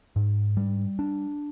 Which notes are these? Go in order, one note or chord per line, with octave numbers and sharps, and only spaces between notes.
G#2
G3
D4